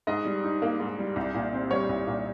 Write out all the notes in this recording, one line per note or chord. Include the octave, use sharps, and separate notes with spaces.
G#2 D#5
G3
D#4
A#3
G#2
G3
C2
A#2
C4
G3 C#5
C2
A#2